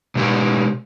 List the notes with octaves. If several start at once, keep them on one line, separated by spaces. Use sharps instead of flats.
B2 G#3 G4